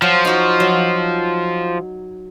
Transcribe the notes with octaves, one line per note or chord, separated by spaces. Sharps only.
F3 F#3
D#4 F#4
F#3